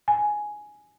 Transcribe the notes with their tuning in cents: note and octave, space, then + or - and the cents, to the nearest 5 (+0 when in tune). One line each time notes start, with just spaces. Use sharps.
G#5 +5